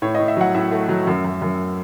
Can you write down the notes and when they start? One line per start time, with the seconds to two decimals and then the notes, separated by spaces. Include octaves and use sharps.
0.02 A2 C#5
0.15 D#5
0.20 A2
0.28 E5
0.37 F#3 F#5
0.54 A2 E5
0.71 A3
0.89 F#3
1.07 F#2
1.25 F#2
1.42 F#2